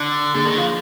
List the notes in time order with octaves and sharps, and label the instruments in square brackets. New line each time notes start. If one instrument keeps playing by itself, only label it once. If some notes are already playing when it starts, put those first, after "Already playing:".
Already playing: [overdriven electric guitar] D3
[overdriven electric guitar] D3 [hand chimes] A#3 D4 G#4
[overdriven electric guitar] D#3
F3